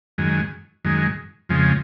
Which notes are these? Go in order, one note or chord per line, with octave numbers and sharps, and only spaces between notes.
F#2 D#3 G#3
F#2 D#3 G#3
F2 C#3 F3 G#3